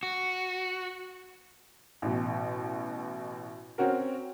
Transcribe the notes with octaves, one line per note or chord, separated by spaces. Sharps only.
F#4
A1 B2
C4 C#4 F#4 A#4